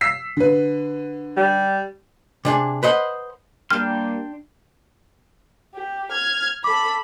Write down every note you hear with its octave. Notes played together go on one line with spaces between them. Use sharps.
E6 B6 C7
D3 B4
G3
C3 D4 G#4
B4 C5 D#5 F#5
G3 A#3 D4 G5 C6 F6
G4
F6 G#6
A4 B5 D6